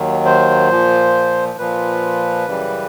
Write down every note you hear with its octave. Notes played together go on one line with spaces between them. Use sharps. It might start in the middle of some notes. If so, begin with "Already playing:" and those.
Already playing: D#2 D#3 F#3
C5
A#2 F3
A#2 F3 B4
F#2 C#3 E3 G3